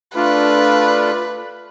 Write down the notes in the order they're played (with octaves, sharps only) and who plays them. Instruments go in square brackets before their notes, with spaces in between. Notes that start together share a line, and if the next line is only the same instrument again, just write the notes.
[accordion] A3 D4 F4 [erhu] B4